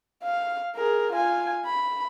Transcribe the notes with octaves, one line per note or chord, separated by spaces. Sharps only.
F5
G#4 A#4
F4 G#5
B5